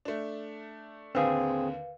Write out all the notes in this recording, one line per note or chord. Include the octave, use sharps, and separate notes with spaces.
A3 D4
D#2 D3 C4 G#4 B4 F5